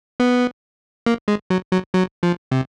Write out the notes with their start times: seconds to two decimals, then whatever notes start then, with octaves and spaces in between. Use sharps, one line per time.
0.20 B3
1.06 A#3
1.28 G#3
1.50 F#3
1.71 F#3
1.94 F#3
2.23 F3
2.52 C3